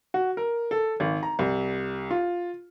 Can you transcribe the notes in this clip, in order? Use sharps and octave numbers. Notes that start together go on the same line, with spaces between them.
F#4
A#4
A4
G#1
A#5
C2
F4